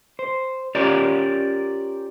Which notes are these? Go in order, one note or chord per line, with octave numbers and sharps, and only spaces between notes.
C5
C#4 F4 G4 A#4 C#5 D5